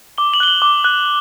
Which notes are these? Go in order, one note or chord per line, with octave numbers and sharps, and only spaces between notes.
D6 G7
F#7
F#6 G7
F#7
D6
F#6